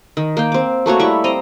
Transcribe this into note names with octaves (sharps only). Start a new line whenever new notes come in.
D#3
A#3 G5
C4 D6
A3 A#3 F#4 C#5
G3 E4 E5 C#6
C4 D#5 A#5